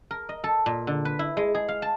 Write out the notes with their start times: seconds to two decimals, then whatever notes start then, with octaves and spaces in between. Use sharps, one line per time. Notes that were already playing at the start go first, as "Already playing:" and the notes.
0.11 A#4
0.29 D#5
0.44 A4
0.66 A#2
0.87 D3
1.05 B4
1.19 E4
1.37 G#3
1.55 G#4
1.68 F5
1.82 A5